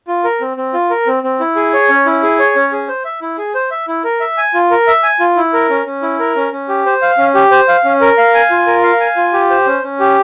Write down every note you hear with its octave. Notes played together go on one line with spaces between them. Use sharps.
F4
A#4
C4
C4
F4
A#4
C4
C4
E4
G#4
C#5
C#4
E4
G#4
C#5
C#4
G#4
C5
E5
E4
G#4
C5
E5
E4
A#4
E5
G#5
F4
A#4
E5
G#5
F4
E4
A#4
C#4
C#4
E4
A#4
C#4
C#4
G4
C5
F5
C#4
G4
C5
F5
C#4
A#4
F5
G#5
F4
A#4
F5
G#5
F4
G4
C5
C#4
C#4
G4